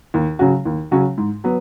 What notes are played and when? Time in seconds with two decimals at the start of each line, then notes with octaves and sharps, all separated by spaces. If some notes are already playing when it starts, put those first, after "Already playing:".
0.14 D#2
0.39 C#3 F#3 C#4 F#4
0.65 D#2
0.91 C#3 F#3 C#4 F#4
1.18 G#2
1.44 F#3 B3